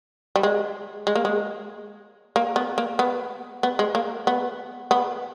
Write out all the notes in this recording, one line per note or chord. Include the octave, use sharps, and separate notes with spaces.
G3
G#3
G#3
A#3
G#3
A#3
B3
A#3
B3
B3
G#3
A#3
B3
B3